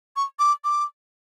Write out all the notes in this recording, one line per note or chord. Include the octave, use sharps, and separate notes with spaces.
C#6
D6
D6